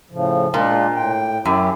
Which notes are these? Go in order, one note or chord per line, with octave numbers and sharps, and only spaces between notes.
A2 C#3 F3
A#2 G#3 D4 F4
A2 G5
F#2 C#4 E4 G4